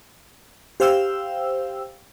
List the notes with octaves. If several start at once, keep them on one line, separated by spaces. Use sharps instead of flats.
G4 C5 F5 G5 E6